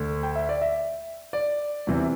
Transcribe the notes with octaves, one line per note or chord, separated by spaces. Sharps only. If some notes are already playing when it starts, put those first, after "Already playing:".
Already playing: D2 D3
G5
E5
D5
E5
D5
E2 C3 E3